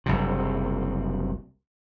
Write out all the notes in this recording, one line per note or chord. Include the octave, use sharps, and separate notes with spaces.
F#1 C2 F#2 C3